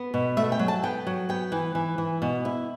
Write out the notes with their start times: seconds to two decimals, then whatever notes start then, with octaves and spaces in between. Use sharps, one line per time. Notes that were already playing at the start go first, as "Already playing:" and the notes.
Already playing: B3
0.14 B2
0.37 A3 E5
0.52 G5
0.59 F#3
0.68 A5
0.83 B3 G5
1.07 F#3
1.29 B3 G5
1.52 E3
1.75 E3
1.98 E3
2.22 B2
2.45 E4